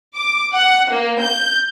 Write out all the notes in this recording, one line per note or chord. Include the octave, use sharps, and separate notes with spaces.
D6
F#5
A#3
G6